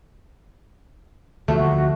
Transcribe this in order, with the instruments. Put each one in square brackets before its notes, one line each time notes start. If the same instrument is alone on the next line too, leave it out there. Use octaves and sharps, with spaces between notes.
[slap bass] D2 D3 F3 [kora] A3 [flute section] F#4